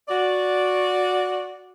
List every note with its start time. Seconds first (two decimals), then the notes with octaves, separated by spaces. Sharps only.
0.09 F#4 D5